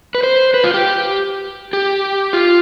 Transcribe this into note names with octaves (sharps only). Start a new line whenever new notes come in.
B4
C5
B4
F4
G4
G4
F4